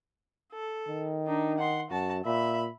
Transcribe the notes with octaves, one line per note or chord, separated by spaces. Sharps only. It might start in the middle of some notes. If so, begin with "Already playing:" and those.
A4
D#3
D4 D#4
F#5 C6
F#2 F#4 A5
A#2 E5 B5